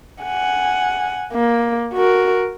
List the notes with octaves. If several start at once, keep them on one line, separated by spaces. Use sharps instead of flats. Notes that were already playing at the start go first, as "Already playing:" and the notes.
F#5 G#5
A#3
F#4 A#4